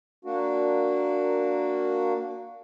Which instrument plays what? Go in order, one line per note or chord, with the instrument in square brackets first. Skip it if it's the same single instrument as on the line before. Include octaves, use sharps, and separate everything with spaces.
[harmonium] A#3 D4 F#4